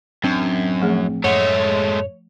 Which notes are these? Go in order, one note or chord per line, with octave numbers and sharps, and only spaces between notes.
A1 F#2 C4 D4
F3 A3 G#4
F#2 A2 G#3 A3 C#5 F#5